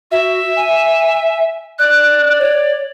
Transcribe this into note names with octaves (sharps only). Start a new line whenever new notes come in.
F#4 E5
G#5
D5 F#6
C#5